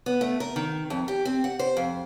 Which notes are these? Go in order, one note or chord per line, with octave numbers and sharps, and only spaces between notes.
B3
A3
A#4
D#3
F2
G4
C4
F#5
C5
F2